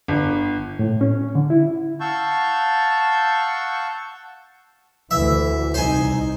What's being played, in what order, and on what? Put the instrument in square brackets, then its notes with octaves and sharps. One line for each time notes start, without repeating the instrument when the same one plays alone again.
[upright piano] G1
[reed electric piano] A2
C#4
D3
E4
[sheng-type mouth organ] F5 F#5 A5 C#6 E6 G6
[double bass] D2 E3 [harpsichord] E5
[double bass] C2 D#4 [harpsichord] C5 G#5